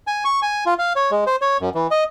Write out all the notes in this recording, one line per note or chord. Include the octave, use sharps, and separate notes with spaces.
G#5
C#6
G#5
F4
F5
C#5
G#3
C5
C#5
F#2
E3
D#5